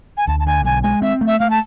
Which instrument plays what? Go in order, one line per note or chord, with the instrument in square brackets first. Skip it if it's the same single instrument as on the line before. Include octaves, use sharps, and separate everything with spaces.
[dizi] G#5
[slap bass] D2 [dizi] A5
[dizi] A5
[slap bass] D3 [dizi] G#5
[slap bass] B1 [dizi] G#5
[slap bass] G#3 [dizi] G#5
[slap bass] C4 [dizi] E5
[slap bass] A3
[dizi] E5
[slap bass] A3 [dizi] F5
[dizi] A5